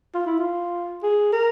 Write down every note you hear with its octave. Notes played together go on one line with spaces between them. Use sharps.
F4
E4
F4
G#4
A#4